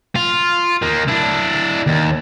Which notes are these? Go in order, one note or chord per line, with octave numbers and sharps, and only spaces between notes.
F4
D#3 A#3
D4 E4
D#2